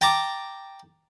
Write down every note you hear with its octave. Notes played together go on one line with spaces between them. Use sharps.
G5 A5 A#5 D6